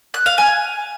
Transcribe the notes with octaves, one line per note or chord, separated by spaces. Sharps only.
F#6
F5
G#5